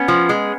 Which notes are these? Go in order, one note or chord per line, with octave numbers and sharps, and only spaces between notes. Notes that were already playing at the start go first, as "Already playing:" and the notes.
Already playing: B3 C#4
F3
G#3